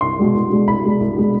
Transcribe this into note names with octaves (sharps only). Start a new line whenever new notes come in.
C2 C6
B2 G#3 D4
C2
B2 G#3 D4
C2 B5
B2 G#3 D4
C2
B2 G#3 D4